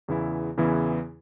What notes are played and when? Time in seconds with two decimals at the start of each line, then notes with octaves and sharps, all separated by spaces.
0.08 E2 C#3 E3 B3 E4
0.57 E2 C#3 E3 B3 E4